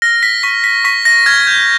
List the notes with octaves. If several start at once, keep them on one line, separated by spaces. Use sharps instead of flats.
F6 A#6
B6
C#6 B6
B6
C#6 B6
A#6
F6 G#6
G6